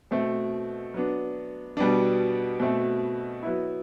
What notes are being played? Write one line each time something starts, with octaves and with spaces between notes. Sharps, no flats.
B2 A3 C4
F#3 B3 D4
B2 G3 B3 D4
B2 A3 C4
F#3 B3 E4